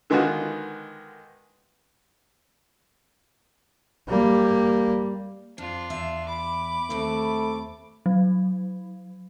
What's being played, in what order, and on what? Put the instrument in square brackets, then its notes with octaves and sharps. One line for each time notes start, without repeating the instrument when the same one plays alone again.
[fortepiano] D3 D#3 G#3 B3 F4 F#4
[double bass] G3 A#3
[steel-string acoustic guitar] F2 [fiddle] D4 F4
[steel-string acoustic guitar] E2 E5
[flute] B5 [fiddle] D6
[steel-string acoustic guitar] D#2 C4 A4 [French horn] A3
[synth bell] F#3